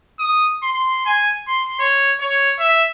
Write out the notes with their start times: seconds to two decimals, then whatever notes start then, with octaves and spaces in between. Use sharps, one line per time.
0.19 D#6
0.63 C6
1.06 G#5
1.48 C6
1.79 C#5
2.20 C#5
2.60 E5